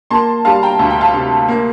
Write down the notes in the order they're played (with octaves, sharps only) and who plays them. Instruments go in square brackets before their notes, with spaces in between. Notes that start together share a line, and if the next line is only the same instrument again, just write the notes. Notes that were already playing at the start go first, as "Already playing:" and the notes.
[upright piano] A#3 A5 C6
G3 F5 A5
G5 A#5
D2 A5
G5
F5 A5
C3
A#3